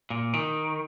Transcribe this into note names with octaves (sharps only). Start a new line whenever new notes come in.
A#2
D#3